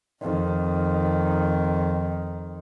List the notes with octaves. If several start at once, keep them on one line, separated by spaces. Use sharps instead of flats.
F2 D#3